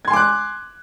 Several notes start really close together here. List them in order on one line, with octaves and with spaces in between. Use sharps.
G#6 C6 G#5 D6 F#6